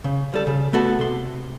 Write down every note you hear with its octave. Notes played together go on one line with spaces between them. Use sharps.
C#3
G3 A4
C#3
A3 B3 F#4 A4
C3 C6